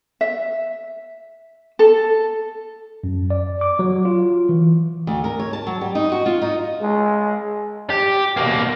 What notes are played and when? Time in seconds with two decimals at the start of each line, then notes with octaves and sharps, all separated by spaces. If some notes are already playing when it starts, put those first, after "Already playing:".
0.21 E5
1.79 A4
3.04 F#2
3.30 D5
3.61 D6
3.79 F#3
4.05 F4
4.49 E3
5.07 D2
5.24 A#4
5.39 C#5
5.53 A5
5.67 F#3
5.81 G3
5.95 D#4
6.12 F#4
6.26 F4
6.42 D#4
6.81 G#3
7.90 G4
8.37 B2 A#3